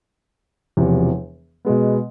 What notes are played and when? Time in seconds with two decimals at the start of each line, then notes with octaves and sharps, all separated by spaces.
0.77 E1 E2 C3 F3
1.65 B2 G#3 B3